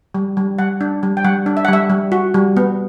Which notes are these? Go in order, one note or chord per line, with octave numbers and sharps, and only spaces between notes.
G3
G3
G3 F#5
D4
G3
G5
G3 F#5
D4
E5
F#5
G3 E5
G3
F#4
G3
B3